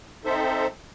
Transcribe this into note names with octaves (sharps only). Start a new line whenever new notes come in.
C4 D#4 A4 C5 E5